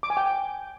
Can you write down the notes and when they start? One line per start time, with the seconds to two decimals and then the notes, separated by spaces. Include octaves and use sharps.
0.03 D6
0.10 G#5
0.17 G5